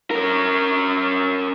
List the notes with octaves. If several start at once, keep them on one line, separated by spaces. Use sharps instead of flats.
C#4 A#4